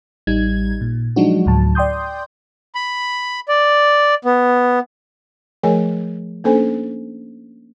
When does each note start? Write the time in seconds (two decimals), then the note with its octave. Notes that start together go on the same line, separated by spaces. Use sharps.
0.27 A1 G3 D#4 G#6
0.81 A#2
1.16 F3 F#3 G#3 D4 D#4 F#4
1.46 D2 A2 F#3 A5
1.75 D5 G5 C6 D#6 G6
2.75 B5
3.48 D5
4.25 B3
5.63 F3 A3 G#4 A#4 C#5 G#5
6.44 A#3 C#4 D4 A4 C5 G#5